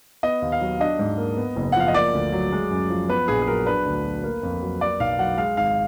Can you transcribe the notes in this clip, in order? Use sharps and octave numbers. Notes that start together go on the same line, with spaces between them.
B3 D#5
D#2
F5
F#3
D4 D#5
G#2
A#3
B3
F#1
F#5
F3 F5
D#5
A#3 D5
D2
F#3
G#3
F#2
F3
B3 B4
A#1 G#4
G#4
F#3 A#4
D4 B4
D2
F#3
A#3
F2
F#3
A#3 D5
B1 F5
F#3 F#5
G#3 F5
G#1 F5